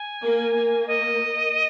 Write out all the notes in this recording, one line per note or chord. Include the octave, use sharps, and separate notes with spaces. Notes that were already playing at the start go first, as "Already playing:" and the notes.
Already playing: G#5
A#3
A#3
D#5